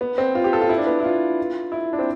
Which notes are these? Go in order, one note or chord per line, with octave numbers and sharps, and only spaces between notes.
B3
C4
F4
G4
A4
F4
E4
D4
B3
E4
F4
E4
D4
C4